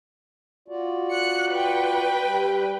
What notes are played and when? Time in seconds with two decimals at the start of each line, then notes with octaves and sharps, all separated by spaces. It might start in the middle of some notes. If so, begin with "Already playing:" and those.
0.68 F4 F#4 D5
1.11 F#6 C#7
1.52 B4 G5
2.25 G3 G4